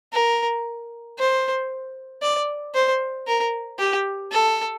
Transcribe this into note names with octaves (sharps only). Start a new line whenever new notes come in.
A#4
C5
D5
C5
A#4
G4
A4